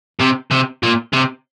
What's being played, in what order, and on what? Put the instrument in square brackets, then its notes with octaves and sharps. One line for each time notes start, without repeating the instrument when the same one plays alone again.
[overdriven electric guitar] C3
C3
A#2
C3